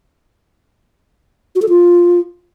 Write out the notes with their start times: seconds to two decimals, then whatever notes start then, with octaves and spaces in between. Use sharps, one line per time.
1.55 F#4
1.62 A4
1.69 F4